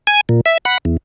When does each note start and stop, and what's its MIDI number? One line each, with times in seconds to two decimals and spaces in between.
0.07 0.21 80
0.29 0.41 46
0.46 0.58 76
0.65 0.78 78
0.65 0.78 83
0.85 0.97 40